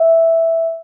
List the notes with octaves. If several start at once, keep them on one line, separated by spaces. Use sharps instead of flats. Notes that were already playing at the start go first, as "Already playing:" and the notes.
Already playing: E5